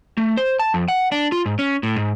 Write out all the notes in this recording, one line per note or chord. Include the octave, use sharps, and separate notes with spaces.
A3
C5
A5
F2
F#5
D4
F4
G#2
C#4
A2
G#2